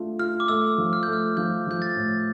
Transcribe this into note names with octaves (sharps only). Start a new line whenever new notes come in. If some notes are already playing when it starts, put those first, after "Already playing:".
Already playing: A3 D4 F4
F4 F6
D6
A3 E6
F3
F6
A3 G6
F6
F3 G6
F3 G6
A6
A2